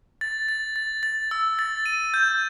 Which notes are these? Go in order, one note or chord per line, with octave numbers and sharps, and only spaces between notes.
A6
A6
A6
A6
E6
A6
D#7
G6